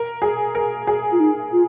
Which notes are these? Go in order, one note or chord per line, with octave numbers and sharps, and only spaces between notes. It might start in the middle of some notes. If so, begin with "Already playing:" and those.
Already playing: A#4
G#4
A#4
G#4
F4
D#4
F4